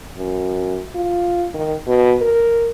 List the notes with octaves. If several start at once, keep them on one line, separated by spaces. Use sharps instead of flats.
F#2
F4
D#3
B2
A#4